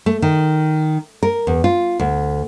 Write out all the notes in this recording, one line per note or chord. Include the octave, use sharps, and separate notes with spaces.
A3
D#3
A#4
E2
F4
D2